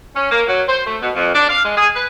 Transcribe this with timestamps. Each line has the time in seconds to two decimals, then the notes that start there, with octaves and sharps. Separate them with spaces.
0.16 C#4
0.31 A#3
0.48 F#3
0.69 C5
0.87 A3
1.02 B2
1.16 F2
1.35 D4
1.49 F5
1.65 G#3
1.77 G#4
1.96 B4